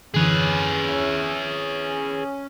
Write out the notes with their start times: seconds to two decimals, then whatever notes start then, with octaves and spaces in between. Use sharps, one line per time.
0.14 F#2 D3 E3 C#4 G#4 B4
0.88 C#5 E5